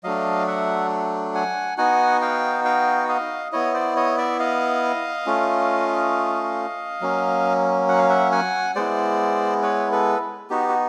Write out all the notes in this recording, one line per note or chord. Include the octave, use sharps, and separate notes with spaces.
F#3 A3 D4 D#5 F5
E5 F#5
F#5 G#5
B3 D#4 F#4 F#5 G#5
F5 G5
F5 G5
D#5 F5
B3 E4 C#5 D#5
C5 D5
C#5 D#5
D5 E5
D#5 F5
A3 C#4 F4
F#3 A#3 C#4
F#5
F5
E5 F#5
F#5 G#5
G#3 B3 E4 C5 D5
B4 C#5
A4 B4
B3 D#4 F#4 G4
F#4